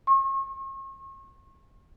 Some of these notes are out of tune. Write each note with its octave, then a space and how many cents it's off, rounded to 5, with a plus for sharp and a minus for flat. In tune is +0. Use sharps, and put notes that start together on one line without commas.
C#6 -40